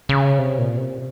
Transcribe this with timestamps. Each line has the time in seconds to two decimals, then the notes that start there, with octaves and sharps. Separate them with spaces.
0.09 C#3
0.38 C3
0.58 A#2
0.77 C3